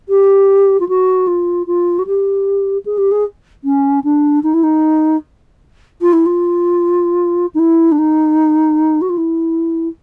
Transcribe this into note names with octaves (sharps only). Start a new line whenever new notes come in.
G4
F4
F#4
F4
F4
F#4
G4
G#4
G4
G#4
C#4
D4
D#4
E4
D#4
F4
E4
F4
D#4
E4
D4
D#4
F#4
F4
E4